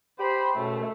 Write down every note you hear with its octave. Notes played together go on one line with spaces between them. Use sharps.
G4 C5 B5
C#2 F#2 B2 A3